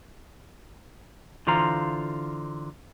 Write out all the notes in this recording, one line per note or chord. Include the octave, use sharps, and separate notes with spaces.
D3 E3 F4 C5 F5 A#5